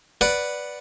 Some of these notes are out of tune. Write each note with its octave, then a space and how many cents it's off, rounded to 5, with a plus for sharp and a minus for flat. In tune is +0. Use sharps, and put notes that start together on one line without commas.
B4 +0 D5 +0 F#5 +0